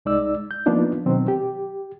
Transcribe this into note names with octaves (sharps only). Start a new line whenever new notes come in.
C2 G#3 D#4 D5 E6
G6
F3 A#3 B3 D4 D#4 F4
B2 D#3 F#3 C4
G4